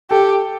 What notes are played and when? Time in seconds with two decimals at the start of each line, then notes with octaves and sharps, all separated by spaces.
0.10 G4 A4